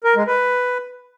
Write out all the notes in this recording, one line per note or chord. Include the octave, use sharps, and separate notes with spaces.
A#4
G#3
B4